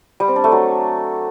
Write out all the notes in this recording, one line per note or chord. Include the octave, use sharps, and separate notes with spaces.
G3
C4
D4
A3
F#3